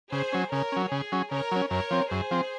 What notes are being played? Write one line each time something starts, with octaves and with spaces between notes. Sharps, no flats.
C#3 G#4 C5
F#3 C#4
C#3 A#4 C#5
F#3 C#4
C#3 G#4
F#3 C#4
C#3 A#4 C#5
F#3 C#4
F#2 A#4 C#5
F3 C4
F#2 G#4 C5
F3 C4